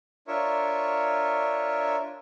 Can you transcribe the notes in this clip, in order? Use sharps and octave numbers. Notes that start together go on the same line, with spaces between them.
D4 F4 A#4 C#5 E5 C#6